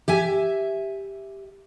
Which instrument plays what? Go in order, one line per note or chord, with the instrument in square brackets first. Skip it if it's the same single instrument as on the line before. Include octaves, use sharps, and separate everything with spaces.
[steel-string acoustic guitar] G4 E5 G#5